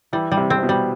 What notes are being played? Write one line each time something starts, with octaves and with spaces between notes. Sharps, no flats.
E3 G3
G3
C3
C4
C3
B2
G3